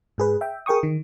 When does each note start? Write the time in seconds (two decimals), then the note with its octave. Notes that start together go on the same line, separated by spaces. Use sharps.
0.18 G#2 G#4 B4
0.41 E5 G5
0.66 G#4 A#4 G5 C#6 D#6
0.83 D#3